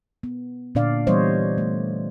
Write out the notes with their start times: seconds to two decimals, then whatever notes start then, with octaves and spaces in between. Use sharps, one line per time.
0.23 B3
0.75 A#2 D3 D4 D5 F5
1.07 E3 G3 B3 C5 C#5 D#5
1.58 A3